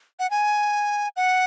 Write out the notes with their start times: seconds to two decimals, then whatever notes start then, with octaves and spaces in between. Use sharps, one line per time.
0.19 F#5
0.31 G#5
1.16 F#5